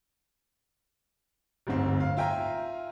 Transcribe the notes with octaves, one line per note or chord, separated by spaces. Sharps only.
D1 G1 G#2 C4
F5
F4 E5 G5 G#5 A#5